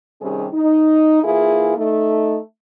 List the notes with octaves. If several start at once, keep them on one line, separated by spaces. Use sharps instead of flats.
C3 D#3 G3 C#4 G4 G#4
D#4
E3 A#3 E4 F4 G#4
A3 D#4